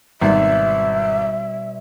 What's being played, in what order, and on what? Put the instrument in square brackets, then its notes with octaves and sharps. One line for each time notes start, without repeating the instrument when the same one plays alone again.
[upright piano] G#1 [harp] B2 G3 C4 [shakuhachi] E5